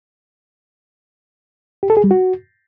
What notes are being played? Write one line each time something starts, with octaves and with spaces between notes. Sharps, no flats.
G4
A4
G#4
G3
F#4